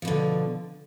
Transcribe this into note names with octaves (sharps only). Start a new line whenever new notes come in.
B2 D3 F3